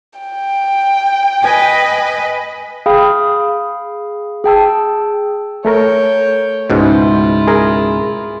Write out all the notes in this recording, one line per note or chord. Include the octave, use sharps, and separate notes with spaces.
G5
B4 D#5 G#5
G#4 F5 G5 B5 D#6
G#4 G5 A5 E6
A3 A4 A#4 C#5 G5
C#2 G#2 B2 E4 F4
G#4 A#4